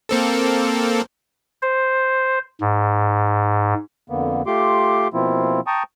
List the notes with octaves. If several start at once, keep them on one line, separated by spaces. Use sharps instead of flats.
A#3 C4 A4
C5
G#2
F2 D3 A#3 B3
A3 F4 G4 C6 D6
B2 F3 A#3 C4 E4 F4
G5 A5 A#5 C#6 D#6